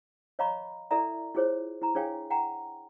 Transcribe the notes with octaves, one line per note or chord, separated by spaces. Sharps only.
C#5 D#5 F5 A#5 B5 C#6
E4 A4 D5 E5 A#5
E4 F4 G#4 C5 C#5
E4 A#5
D4 G#4 C#5 F5 G5 G#5
F#5 G5 A#5